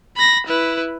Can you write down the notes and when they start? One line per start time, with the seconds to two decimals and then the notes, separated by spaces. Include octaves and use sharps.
0.17 B5 A#6
0.47 E4 B4